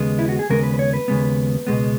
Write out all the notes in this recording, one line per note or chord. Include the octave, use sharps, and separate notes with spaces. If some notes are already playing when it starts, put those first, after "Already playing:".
Already playing: D#2 C#3 G#3 B3
E4
F#4
G#4
D#2 C#3 G#3 B3 A#4
B4
B4
C#5
B4
D#2 C#3 G#3 B3
C#2 B2 G#3 B3